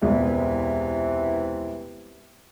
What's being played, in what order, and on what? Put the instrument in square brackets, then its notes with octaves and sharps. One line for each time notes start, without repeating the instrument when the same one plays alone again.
[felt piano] E1 C#2 [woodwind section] C3 E3